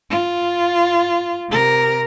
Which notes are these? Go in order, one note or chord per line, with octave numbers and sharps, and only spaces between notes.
F4
C3 A#4